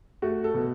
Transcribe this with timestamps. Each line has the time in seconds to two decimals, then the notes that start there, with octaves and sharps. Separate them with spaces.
0.22 A3 F#4
0.44 A4
0.54 B2